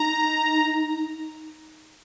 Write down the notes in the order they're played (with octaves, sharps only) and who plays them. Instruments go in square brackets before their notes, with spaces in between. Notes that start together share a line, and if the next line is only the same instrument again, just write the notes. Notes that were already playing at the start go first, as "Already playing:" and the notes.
Already playing: [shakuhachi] D#4 [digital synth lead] A#5